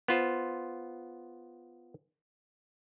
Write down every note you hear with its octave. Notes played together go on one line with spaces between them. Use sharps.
B3 F4 C5